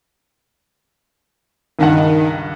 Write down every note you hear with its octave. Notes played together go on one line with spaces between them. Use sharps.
C#2 G2 D#3 F#5